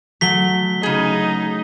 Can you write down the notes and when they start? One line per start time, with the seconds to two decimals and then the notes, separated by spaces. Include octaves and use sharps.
0.21 F#3 A3 B6 G7
0.83 C#3 D#4 G#4